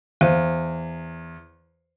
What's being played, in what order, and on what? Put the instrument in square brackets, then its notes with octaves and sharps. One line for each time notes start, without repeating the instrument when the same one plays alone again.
[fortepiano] E2 [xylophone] C5 F5 D#7